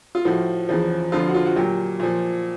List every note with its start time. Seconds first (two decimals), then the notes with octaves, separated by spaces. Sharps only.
0.15 F4
0.25 A2 F3 F#4
0.69 E2 C#3 F3
1.12 F2 D3 F3 F4
1.28 F#4
1.34 F4
1.45 F#4
1.56 A#2 F#3 G4
2.00 A#2 F3